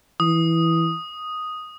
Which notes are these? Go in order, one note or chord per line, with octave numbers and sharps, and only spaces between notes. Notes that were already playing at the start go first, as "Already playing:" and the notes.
E3 D#6